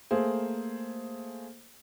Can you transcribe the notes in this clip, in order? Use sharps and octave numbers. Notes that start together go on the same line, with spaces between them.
A3 A#3 G#4 C5